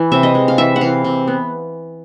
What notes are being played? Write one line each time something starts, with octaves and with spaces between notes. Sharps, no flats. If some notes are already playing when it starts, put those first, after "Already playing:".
Already playing: E3
C3 E5
D#5
G#3
F5
E3 E5
F#5
E3 F5
C3
B3